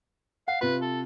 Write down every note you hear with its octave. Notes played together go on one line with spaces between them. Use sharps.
F5 F#5
C3 F4 B4
A4